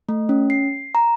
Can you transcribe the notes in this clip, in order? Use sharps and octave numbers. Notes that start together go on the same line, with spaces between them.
A3
C#4
C7
A#5